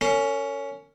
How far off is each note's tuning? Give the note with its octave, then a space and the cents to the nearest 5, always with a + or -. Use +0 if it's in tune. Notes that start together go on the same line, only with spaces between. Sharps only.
C#4 +15 A#4 -40